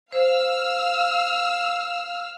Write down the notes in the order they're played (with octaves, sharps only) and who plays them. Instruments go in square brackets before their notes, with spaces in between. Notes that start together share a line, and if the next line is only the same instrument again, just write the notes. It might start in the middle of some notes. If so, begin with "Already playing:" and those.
[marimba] C5 [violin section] F5 E6 F6